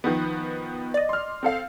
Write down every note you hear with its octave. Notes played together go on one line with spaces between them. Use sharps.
D#3 F3 B3
D5 D#5
C6 F6
C4 A4 F5